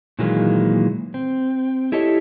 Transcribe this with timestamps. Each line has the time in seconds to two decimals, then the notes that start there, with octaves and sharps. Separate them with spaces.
0.19 A#2 D#3 E3 F#3 G#3 A#3
1.14 C4
1.92 E4 G4 A4 C#5 D#5